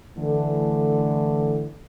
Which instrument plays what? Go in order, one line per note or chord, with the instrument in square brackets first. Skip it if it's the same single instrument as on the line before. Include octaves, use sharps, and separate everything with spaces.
[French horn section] D3 E3 A3